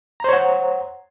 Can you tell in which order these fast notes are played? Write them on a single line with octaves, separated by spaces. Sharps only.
A#5 C5 C#5 F#5